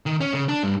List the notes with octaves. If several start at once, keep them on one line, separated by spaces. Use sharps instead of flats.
D#3
C#4
C#3
D4
G2